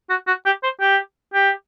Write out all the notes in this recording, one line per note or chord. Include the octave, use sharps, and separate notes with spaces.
F#4
F#4
G4
C5
G4
G4